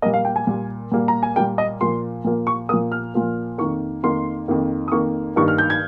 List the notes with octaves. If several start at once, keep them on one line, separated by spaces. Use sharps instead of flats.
A#2 G3 A#3 D#5
F5
G5
G#5
A#2 G3 A#3
A#2 G3 A#3
A#5
G#5
A#2 G3 A#3 G5
D#5
A#2 F3 A#3 C6
A#2 F3 A#3
C#6
A#2 F3 A#3 D#6
F6
A#2 F3 A#3
F2 D#3 A#3 C#6
F2 D#3 A#3 C6
F2 D#3 A#3
D#6
F2 D#3 A#3 C#6
G2 D#3 A#3 C#6
F6
G6
G#6